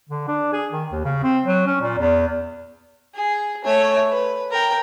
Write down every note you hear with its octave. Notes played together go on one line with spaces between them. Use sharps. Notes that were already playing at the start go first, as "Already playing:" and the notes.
D3
D4
G#4
D#3
D#2
C#3
C4
F#3
C#4
A#2
E2
G#4
A3 C#5
B4
A#4 G5